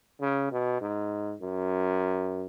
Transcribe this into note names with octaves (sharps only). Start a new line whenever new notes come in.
C#3
B2
G#2
F#2